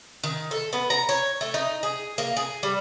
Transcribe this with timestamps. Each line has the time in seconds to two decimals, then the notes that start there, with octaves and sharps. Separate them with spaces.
0.24 D#3
0.51 A4
0.73 B3
0.90 A#5
1.09 C#5
1.41 A3
1.54 D#4
1.83 G#4
2.18 A#3
2.37 G#4
2.63 G3